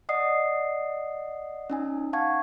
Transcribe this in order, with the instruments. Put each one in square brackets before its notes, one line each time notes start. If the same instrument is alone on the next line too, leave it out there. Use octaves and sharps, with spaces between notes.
[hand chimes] D5 D#5 F#5 D#6 C7
C#4 D#4 G#5
F5 F#5 A5 C#6 G#6